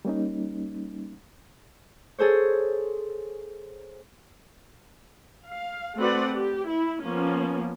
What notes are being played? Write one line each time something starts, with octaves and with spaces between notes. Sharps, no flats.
G3 A#3 C#4 D#4
G#4 A4 C5 C#5
F5
A3 C4 F#4 B4 D5 F#5
G4
E4
F3 A#3 B3 C#4